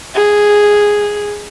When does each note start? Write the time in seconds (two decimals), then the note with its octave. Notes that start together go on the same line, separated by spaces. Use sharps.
0.15 G#4